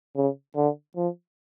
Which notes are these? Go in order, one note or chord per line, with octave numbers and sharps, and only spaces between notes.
C#3
D3
F3